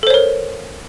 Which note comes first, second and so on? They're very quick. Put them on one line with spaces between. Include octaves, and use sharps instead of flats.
A4 C5 C#5 A#4